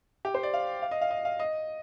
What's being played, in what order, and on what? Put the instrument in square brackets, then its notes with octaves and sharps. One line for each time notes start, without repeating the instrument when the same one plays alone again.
[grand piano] G4
C5
D5
F5
F5
D#5
F5
D#5
F5
D#5